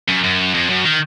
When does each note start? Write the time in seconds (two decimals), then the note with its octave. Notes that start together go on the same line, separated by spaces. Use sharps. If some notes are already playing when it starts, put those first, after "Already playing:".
0.09 F#2
0.24 F#2
0.54 F2
0.69 F#2
0.84 D#3